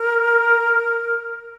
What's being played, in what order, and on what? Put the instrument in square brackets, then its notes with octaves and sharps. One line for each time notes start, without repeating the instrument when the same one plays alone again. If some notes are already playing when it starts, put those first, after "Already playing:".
Already playing: [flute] A#4